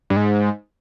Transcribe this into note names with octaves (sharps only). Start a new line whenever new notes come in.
G2
G#2